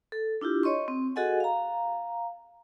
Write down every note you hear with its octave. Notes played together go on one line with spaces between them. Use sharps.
A4
D4 E4 F4 G4
C#5 D#5 C6 C#6
C4
F#4 G#4 A4 D#5 F#5 G#5
F5 A#5